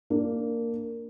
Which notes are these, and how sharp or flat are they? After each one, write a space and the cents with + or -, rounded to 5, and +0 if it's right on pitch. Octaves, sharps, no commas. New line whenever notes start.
A#3 -10 D4 +0